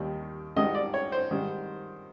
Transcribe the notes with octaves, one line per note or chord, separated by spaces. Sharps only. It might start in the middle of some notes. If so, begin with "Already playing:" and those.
Already playing: D#2 D#3 G3
G#1 G#2 D#3 G3 D#5
D5
C#5
C5
G#2 D#3 G3